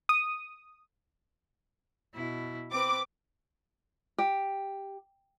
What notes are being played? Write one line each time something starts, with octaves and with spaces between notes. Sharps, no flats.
D#6
B2 E4
C4 B4 D6
G4